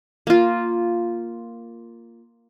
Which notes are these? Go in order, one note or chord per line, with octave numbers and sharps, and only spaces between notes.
A#3 F4